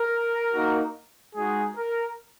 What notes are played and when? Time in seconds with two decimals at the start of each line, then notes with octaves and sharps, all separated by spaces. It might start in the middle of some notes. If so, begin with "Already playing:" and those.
Already playing: A#4
0.52 A#3 D#4 F#4
1.35 G#3 D#4 F#4 G#4
1.76 A#4